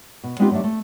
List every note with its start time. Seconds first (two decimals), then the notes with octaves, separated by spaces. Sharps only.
0.24 B2
0.39 G#3 B3 C4 D#4 F4 G4
0.51 F#3 G3 A3 D4 E5
0.64 A3